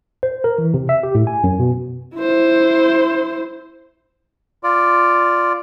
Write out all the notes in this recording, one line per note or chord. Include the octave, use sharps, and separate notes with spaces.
C5
A#4
E3
C3
E5
G4
A2
G#5
F#2
B2
E4 C5
F4 D5